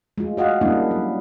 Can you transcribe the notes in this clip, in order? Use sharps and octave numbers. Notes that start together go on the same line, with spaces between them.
G#3 A3 F4
F#4 D#5 F5 F#5
G3 G#3 A#3 C#4 D4 E4
F#3